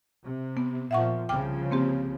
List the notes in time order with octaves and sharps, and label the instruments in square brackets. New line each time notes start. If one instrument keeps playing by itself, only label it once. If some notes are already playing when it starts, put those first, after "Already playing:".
[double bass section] C3
[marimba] B3
[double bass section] A#2 F3 [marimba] E5 F#5 C#6
[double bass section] C2 C#3 F3 [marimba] G5 D6 F6
[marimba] A#3 C4 G4